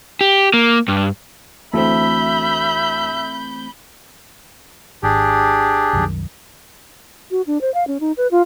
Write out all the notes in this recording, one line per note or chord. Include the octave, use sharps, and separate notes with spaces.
G4
A#3
G2
D2 E3 A3 C4 E5 B5 G6
G#1 D4 G4 G#4
C2 F#2 D#3
F#4
D4
C5
F5
C#4
D#4
B4
F4